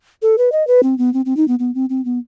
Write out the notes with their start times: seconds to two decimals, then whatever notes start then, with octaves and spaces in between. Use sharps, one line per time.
0.22 A4
0.38 B4
0.52 D#5
0.67 B4
0.83 C4
0.98 B3
1.14 C4
1.26 C4
1.37 D#4
1.48 B3
1.59 B3
1.75 C4
1.90 C4
2.05 B3